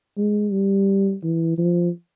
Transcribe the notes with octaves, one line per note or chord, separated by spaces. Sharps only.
G#3
G3
E3
F3